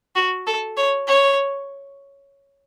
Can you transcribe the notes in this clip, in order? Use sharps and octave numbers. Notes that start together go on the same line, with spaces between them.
F#4
A4
C#5
C#5